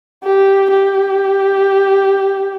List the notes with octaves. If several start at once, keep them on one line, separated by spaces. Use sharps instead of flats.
G4
G4